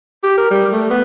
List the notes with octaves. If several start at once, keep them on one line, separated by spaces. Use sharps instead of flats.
G4
A#4
G3
A3
B3